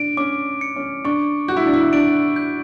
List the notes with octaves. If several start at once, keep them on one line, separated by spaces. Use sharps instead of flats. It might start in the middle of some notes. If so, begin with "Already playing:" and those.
Already playing: D4 D7
C#4 D6
C#7
C#4
D4 C#6
F#4 G6
E4
D4
E4
D4 D7
G6